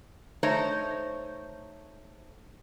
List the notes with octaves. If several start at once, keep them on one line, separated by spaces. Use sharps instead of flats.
A3 D#4 C5 C#5 D#5